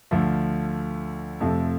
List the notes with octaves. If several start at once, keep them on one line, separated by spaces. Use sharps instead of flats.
D2 D3 F3 A3
F2 C3 F3 A3